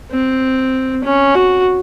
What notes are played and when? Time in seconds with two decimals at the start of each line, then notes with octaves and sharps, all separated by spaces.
0.11 C4
1.04 C#4
1.35 F#4